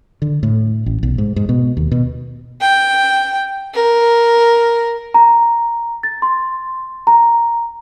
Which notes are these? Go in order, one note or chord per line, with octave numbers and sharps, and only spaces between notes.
D3
A2
A1
B1
G#2
G#2
B2
D#2
B2
G5
A#4
A#5
A6
C6
A#5